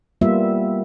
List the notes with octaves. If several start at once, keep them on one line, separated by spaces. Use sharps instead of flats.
G3 A#3 B3 F4 E5